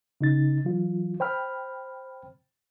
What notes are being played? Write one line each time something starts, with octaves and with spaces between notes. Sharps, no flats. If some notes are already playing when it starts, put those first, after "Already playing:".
C#3 D#4 A6
E3 F#3 F4
C5 G5 B5 F6